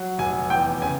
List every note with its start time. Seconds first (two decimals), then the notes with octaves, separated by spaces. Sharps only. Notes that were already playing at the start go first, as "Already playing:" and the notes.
Already playing: F#3
0.18 F1 G#5
0.50 E2 G5
0.82 C#3 G#5